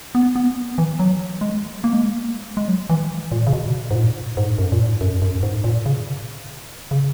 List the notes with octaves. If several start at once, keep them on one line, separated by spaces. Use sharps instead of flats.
B3
B3
E3
F#3
G#3
A#3
G#3
A#3
G#3
F#3
E3
A#2
C#3
B2
G#2
A#2
G#2
F#2
A#2
G#2
F#2
F#2
G#2
A#2
C#3
C#3